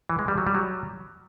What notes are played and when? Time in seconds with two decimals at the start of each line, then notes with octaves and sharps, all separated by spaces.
0.09 E3
0.19 G#3
0.28 G3
0.38 F#3
0.47 G3
0.55 F#3